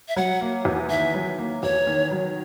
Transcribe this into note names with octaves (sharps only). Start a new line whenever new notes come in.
E5
F#3 F#5
A#3
E2
D#3 E5
F#3
A#3
E2 C#5
D#3
F#3